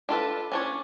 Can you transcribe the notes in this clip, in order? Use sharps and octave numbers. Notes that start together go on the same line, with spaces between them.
D4 F4 A4 B4
C#4 D4 C#5